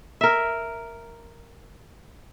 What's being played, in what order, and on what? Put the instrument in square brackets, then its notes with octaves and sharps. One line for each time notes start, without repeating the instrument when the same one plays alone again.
[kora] A#4 E5